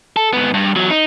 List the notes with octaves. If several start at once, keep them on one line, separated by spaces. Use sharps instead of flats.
A4
G#2 B3
G2
E2 F#3
D#4